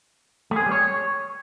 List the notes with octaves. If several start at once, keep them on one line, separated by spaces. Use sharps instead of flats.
A3
G#4
C4
G3
C#5